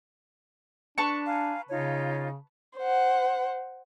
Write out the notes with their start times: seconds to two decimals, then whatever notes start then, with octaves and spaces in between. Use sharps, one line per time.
0.98 D4 B4 A5 C#6
1.27 F5 G#5 A#5
1.69 C#3 D#4 F4 C#5
2.78 C5 F#5